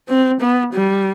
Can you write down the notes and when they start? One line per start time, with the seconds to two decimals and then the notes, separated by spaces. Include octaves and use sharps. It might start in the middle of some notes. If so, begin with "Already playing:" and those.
0.09 C4
0.41 B3
0.74 G3